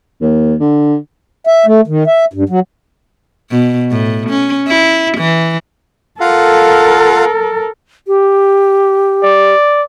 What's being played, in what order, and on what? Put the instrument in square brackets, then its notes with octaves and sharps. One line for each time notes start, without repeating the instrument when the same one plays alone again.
[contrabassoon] D#2
D3
[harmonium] E5
A3
D#3
E5
G2
F#3
[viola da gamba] B2
A2
C#4
E4
E3
[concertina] F4 F5 F#5 [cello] A4 A#4
[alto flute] G4
[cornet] D5